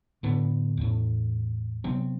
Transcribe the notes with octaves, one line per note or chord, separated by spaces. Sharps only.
A2 D3 B3
E2 A2
C3 F#3 B3 C4